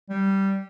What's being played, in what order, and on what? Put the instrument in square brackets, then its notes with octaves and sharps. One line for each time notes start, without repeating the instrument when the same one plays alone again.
[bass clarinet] G3